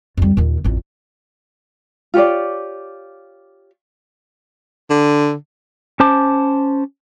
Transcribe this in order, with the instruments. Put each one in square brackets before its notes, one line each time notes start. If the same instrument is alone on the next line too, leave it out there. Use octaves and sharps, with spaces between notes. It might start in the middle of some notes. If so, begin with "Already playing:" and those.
[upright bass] F2 G3
D#2 A#2
A1 F2
[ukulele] F4 G4 C#5 D5
[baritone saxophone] D3
[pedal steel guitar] C#4 C5 A5 D6